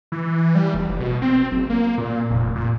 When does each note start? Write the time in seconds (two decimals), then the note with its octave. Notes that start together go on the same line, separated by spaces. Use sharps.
0.12 E3
0.55 G3
0.74 F1
0.89 F1
1.00 B2
1.22 C4
1.52 F#1
1.70 A#3
1.98 A#2
2.30 F1
2.55 A#2